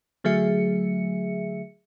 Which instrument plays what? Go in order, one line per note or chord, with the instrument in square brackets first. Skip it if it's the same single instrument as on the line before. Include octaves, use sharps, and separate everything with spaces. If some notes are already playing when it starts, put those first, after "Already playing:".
[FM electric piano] D3 F#3 A3 G#4 E5 C#7